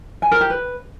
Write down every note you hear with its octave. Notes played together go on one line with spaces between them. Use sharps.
G#5
A#4
G4
B4